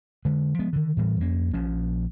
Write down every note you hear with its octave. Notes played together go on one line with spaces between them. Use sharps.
D3 G#3
F3 G#3 B3
D3 D#3
A2 E3 G3
F2 A#3 C#4
A#1 A#2 F3 C#4